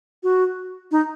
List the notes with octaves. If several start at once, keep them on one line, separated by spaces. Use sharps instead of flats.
F#4
D#4